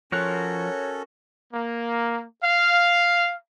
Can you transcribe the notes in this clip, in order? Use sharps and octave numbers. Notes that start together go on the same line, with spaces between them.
F3 C#4 F#4 A4 A#4 C#5 F#6
A#3
F5